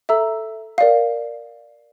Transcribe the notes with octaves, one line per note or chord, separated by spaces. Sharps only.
A4 E5 A#5 E6
A#4 D5 F5